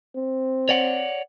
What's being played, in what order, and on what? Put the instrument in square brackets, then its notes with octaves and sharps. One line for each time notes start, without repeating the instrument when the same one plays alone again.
[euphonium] C4
[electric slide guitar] C#5 D5 F#5